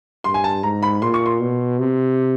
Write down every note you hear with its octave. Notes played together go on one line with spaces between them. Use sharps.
G2 C6
G#5
A5
G#2 A#5
B5
A#2 C6
C#6
C6
B2
C3